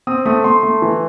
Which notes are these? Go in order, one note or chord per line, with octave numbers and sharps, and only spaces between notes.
C4 D#6
A3 D#6
A3 C6
A3
E3